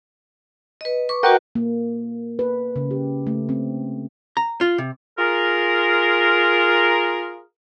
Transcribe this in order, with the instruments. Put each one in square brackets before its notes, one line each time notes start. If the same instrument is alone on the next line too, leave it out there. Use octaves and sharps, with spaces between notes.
[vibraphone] B4 D#5
B4 C#6 D6
[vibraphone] F#4 B4 D#5 [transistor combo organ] A#4 F#5 G5
[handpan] A#3
B4
C#3
G4
A3
C4
[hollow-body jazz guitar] A#5
F4
C3
[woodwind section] F4 G#4 A#4